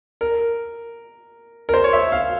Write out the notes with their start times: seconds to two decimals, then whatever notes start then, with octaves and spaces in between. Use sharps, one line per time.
0.21 A#4
1.69 A#4
1.74 C5
1.84 C#5
1.93 E5
2.12 F5